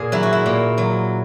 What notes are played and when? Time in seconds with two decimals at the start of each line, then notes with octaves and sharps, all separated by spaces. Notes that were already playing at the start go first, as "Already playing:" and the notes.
Already playing: A#2 G#4
0.12 F#3 E4
0.23 F#4
0.33 E4
0.46 A#2
0.78 F#3